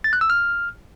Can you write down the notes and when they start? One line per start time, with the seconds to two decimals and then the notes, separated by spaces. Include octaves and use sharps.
0.04 A6
0.13 F#6
0.21 E6
0.30 F6